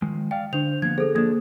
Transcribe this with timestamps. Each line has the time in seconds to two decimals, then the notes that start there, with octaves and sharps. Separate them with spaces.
0.02 D#3 F3 G#3
0.31 D5 F5 G5
0.53 D3 D4 C5 F7
0.82 F3 A#3 B3 G#6
0.98 G#4 A4 C5
1.15 F3 A#3 D4 D#6 G#6